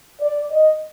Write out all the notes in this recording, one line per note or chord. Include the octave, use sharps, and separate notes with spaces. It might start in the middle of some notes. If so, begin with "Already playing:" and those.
D5
D#5